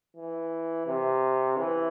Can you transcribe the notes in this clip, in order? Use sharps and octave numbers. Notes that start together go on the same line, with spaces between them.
E3
C3
E3